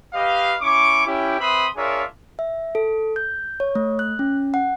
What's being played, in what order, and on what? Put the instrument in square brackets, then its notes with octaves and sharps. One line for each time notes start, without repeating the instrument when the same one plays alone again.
[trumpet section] G4 B4 D#5 F5
C#4 E4 C#6 D6
C#4 E4 G4
C4 B4 E5 B5 C6 D#6
D4 F4 G#4 A#4 C#5 E5
[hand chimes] E5
A4
G6
C#5
A3
F#6
C#4
F#5